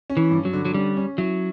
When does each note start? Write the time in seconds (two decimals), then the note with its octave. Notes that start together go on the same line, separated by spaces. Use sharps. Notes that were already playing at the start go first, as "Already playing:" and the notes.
0.10 C#4
0.17 E3
0.31 G2
0.45 F#3
0.53 D3
0.65 F#3
0.74 G3 C#4
0.97 C#4
1.18 F#3 E4